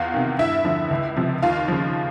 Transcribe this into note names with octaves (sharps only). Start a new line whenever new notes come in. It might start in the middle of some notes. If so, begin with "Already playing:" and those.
Already playing: E2 F4 F5
C3 D#3
G2 E4 E5
D3 F3
C#2
C3 F3
D#2 F4 F5
C#3 F3